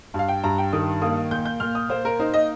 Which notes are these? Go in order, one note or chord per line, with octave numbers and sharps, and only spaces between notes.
G2
F5
G5
G2 A#5
G5
D#3 D#6
A#3 D#6
A#2 G6
G6
A#2 F6
D#6
A#3 C5
A#4
D#4 C5
D#5